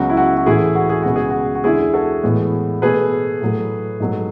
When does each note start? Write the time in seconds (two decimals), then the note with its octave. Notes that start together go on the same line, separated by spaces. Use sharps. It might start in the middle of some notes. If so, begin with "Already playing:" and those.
Already playing: C#2 C#3 F#3 B3 F#4
0.10 E4
0.17 F#4
0.37 F#4
0.46 A2 E3 A3 E4 G#4
0.75 F#4
0.90 G#4
1.03 C#2 B2 G#3 B3 F#4
1.16 G#4
1.30 F#4
1.55 F#4
1.64 E2 D3 G#3 E4 G#4
1.93 F#4 A4
2.23 A2 E3 G#3 B3
2.82 B2 A3 G#4 B4
3.41 A2 F#3 A3
4.00 G#2 F#3 A3